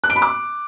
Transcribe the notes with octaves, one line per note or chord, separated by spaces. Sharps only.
F#6
D7
B5
D6